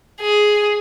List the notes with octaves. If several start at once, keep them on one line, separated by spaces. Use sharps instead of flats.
G#4